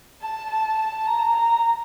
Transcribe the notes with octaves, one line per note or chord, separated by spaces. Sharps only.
A5
A5
A5
A#5
A#5